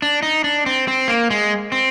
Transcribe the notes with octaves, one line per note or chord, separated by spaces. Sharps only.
D4
D#4
D4
C4
C4
A#3
G#3
C4